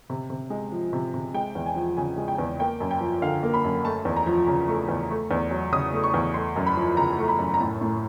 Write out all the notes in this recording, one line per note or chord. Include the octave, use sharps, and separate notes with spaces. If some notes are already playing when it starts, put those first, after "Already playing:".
C3
C3
G#3
F3
C3
C3
G#3 G5
E2
G#5
F3
C#3 G#5
G#3
G5
E2
A#3 G5
F#2
G5
F3
D3 F5
A#3
B5
F#2
A3 A5
E2
A#5
F3
C#3
A3
E2
A3
E2
F#3
C#3 D#6
A3
C#6
E2
A3 C6
F#2
B5
F3
C#3 A#5
A3
B5
F#2
A#5
A2 A5
A2